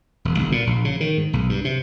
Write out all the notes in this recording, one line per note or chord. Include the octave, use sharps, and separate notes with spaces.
E1
G1
A#2
A#1
C#3
D#3
G#2
B1
G2
C3